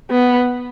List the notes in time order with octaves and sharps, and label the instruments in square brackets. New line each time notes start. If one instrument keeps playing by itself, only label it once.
[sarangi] B3